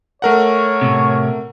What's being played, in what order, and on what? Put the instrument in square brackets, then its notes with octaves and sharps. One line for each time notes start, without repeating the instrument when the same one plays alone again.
[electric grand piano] A3 A#4 F#5 [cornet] C#5
[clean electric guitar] A2 C3